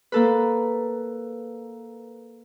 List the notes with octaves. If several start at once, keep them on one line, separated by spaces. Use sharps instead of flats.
A#3 A4 B4